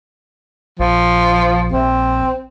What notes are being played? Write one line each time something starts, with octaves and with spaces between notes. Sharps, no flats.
A#1 F3
A#1 C4